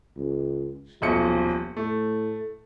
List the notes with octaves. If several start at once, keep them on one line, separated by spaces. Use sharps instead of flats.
C#2
D#1 B1 F3 C#7
A2 A3